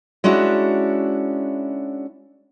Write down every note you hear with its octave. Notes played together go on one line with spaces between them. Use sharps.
G#3 C#4 D4 E4 F#4